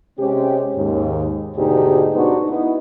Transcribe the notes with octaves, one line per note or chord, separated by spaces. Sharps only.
C3 G#3 C#4 G4
D#2 G#2
D2 G#2 B2 D#4 G4 G#4
B3 D4 D#4 F#4 C5
B3 D#4 E4